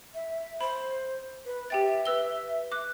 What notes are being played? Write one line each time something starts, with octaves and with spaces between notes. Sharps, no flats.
E5
C5 B5
B4
G4 E5 G5 A6
B4 E6 G7
D6 F#6